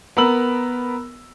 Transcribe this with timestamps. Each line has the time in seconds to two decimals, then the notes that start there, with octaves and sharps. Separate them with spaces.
0.17 B3 A#4 B5 E6 F#7